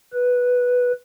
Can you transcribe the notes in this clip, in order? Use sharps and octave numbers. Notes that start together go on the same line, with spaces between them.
B4